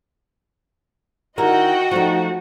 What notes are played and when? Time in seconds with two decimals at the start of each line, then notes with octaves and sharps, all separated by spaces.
1.38 D#3 E4 F#4 A#4 D#5 F#5 G5
1.91 F3 A3 D#4